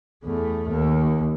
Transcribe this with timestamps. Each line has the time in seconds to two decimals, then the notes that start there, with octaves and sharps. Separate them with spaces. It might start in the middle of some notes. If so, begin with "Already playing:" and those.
0.24 E2 A3
0.69 D#2